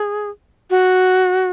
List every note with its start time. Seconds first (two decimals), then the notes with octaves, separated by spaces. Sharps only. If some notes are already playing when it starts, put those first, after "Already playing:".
Already playing: G#4
0.70 F#4